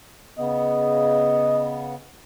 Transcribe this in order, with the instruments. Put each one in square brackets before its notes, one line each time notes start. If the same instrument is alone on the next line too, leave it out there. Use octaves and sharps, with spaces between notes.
[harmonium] C#3 B3 [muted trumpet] D#5